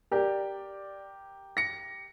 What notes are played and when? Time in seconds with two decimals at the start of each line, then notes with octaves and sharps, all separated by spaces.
0.11 G4 A#4 D5
1.57 A#6 C#7